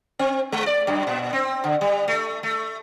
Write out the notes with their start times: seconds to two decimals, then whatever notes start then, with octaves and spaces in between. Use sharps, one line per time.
0.19 C4
0.52 G#3
0.66 D5
0.87 F#2
1.07 A#2
1.33 C4
1.64 D3
1.81 G3
2.08 A3
2.43 A3